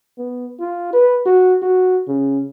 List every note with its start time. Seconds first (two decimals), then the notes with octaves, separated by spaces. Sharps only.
0.18 B3
0.60 F4
0.93 B4
1.26 F#4
1.62 F#4
2.08 C#3